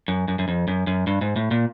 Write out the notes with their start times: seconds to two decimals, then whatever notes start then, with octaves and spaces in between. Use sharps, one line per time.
0.08 F#2
0.28 F#2
0.39 F#2
0.48 F2
0.68 F#2
0.87 F#2
1.07 G2
1.21 G#2
1.36 A2
1.51 A#2